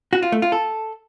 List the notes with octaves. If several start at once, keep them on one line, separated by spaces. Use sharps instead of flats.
F#4
F4
A3
F4
A4